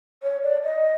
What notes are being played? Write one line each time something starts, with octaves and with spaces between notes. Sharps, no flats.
C#5
D5
D#5